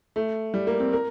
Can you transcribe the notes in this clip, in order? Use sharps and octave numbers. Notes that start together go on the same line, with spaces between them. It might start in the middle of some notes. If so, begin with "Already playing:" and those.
A3
G3
A#3
C4
A#4